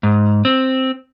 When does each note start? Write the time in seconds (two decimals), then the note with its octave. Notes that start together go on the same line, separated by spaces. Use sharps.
0.03 G#2
0.45 C4